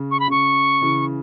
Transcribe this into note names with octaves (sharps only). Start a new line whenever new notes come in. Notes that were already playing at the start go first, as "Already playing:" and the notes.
Already playing: C#3
C#6
B5
C#3 C#6
C#3 E3